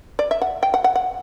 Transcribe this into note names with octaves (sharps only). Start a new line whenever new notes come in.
D5
E5
F#5
G5
F#5
F#5
F#5